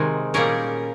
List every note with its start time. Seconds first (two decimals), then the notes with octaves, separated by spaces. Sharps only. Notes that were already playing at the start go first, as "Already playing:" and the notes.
Already playing: C3 D#3 G#3
0.34 A#2 G3 A#3 C#4 G#4 A#4